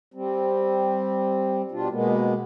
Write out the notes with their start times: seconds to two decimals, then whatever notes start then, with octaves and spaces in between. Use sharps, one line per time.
0.14 G3 C4
1.72 B2 G3 D4 F4
1.91 B2 G#3 A#3 B3